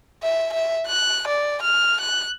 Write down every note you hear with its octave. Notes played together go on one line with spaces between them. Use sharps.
E5
E5
F#6
D5
F6
F#6